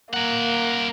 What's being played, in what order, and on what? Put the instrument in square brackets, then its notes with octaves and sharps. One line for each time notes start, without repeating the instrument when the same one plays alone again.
[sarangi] A#3 [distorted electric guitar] A#4 F#5